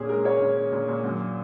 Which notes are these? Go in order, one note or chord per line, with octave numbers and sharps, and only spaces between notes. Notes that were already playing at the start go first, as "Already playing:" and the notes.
Already playing: A#2 C#4 G#4
G#3 A#4
C#4 C#5
A#2
C#4
A#2
A#2
F#2